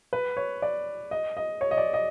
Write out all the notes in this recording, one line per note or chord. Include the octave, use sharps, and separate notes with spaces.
B4
C#5
D5
D#5
D#5
C#5
D#5
D5
D#5